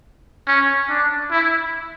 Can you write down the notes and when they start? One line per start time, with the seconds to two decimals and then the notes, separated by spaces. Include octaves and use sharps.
0.48 C#4
0.89 D4
1.31 E4